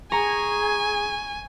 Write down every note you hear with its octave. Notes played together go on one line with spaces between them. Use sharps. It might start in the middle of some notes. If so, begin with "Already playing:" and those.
G#4 G#5 A#5 C#6